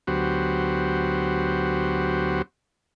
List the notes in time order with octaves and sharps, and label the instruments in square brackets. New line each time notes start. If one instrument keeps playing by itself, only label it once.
[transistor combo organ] D2 F#3 B3 F#4 G4 C5